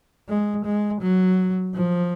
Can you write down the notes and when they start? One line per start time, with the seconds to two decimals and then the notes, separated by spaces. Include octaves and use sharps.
0.29 G#3
0.65 G#3
1.01 F#3
1.75 F3